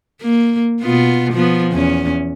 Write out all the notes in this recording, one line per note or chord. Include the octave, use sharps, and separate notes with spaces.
A#3
B2 B3 F4
F3 B3
E2 C#4